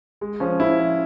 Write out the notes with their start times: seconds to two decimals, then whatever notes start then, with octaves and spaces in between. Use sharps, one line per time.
0.21 G#3
0.40 F3 C#4
0.60 F3 E4
0.80 F3